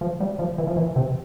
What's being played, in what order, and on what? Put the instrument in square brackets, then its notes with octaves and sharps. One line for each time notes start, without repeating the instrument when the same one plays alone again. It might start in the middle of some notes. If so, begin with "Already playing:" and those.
[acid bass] F3
G3
F3
E3
F3
E3
C3